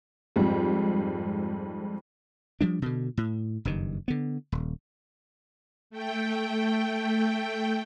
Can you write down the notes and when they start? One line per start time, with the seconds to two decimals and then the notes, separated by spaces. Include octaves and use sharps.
0.36 F2 G#2 G3
2.61 F3 G3 D4
2.82 B2 D3
3.17 A2
3.65 F#1 G2 D#3
4.08 D3 B3
4.52 D#1
5.90 A3 G5